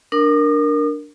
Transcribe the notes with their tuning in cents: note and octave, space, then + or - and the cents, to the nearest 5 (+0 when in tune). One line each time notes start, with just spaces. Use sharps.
D4 +0 A#4 +0 D#6 -40